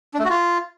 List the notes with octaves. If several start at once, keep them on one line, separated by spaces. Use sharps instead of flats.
D4
A3
F#4
F4